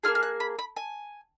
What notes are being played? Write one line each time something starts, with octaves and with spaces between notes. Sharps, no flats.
A#3 F4 G#4 F6
F6
F#6
B5
B5
G#5